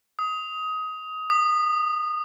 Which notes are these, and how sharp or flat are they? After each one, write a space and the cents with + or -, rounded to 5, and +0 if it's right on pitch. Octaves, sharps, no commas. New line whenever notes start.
D#6 +20
D#6 -20